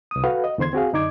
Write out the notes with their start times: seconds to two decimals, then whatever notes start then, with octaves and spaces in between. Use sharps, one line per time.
0.11 C2 D#6
0.24 F#4 A4 B4 F5 F#5
0.44 D#5
0.58 E2 D3 C5 C6 G#6
0.73 C4 F#4 G#4 F5
0.93 F#2 D3 D#4 D5 D6 G#6